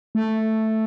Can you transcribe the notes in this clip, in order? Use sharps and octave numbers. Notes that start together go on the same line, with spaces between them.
A3